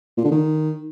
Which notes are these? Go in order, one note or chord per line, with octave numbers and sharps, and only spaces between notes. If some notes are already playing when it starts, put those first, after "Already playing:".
A#2
D3
D#3